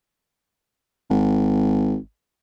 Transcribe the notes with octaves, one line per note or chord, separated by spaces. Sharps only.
G#1